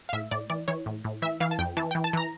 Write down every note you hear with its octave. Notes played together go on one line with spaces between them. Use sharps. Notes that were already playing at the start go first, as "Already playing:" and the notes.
F5
A2 E5
A2 D5
E3 D5
E3 C#5
A2
A2
E3 E5
E3 F5
A5
F2 G5
E3 A5
E3 G5
A5
E3 A#5